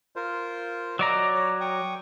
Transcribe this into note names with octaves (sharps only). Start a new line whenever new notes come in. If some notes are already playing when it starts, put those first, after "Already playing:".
F4 A#4 C5
F#3 D5 D#5 A#5
C#5
G5 C#6 D#6